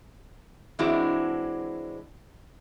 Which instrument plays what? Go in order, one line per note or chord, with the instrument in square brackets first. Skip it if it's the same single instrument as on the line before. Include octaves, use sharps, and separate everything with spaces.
[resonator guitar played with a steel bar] E3 G#3 C4 D4 E4 F#4